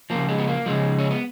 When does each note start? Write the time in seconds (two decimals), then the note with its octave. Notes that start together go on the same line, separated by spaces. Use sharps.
0.10 C#3 F3 A#3
0.29 G#3
0.38 B3
0.47 A#3
0.66 C#3 F3 G#3
0.99 C#4
1.11 B3